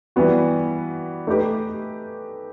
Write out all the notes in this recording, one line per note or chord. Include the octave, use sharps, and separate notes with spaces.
E3 G3 B3 F#4
A3 D#4 G4 B4